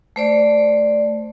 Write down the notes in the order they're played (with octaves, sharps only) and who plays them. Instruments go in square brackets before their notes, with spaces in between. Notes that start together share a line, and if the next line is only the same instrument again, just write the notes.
[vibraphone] A3 C5 D5